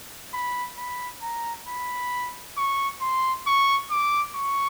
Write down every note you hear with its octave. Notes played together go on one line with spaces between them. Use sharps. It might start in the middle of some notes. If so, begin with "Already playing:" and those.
B5
B5
A#5
B5
C#6
C6
C#6
D6
C#6